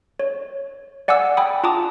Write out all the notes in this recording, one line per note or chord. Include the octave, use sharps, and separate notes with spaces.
C#5
D5 F#5 G#5 D6 E6
G5 G#5 B5 D#6
F4 A5 A#5 D6 D#6